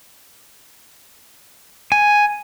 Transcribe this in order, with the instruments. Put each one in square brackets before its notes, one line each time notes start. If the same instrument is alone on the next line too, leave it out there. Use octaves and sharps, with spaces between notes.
[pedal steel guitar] G#5